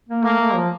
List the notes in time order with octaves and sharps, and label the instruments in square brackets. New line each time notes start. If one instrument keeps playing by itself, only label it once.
[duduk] A#3
[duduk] A3 [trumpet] A#3
[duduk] A3
F3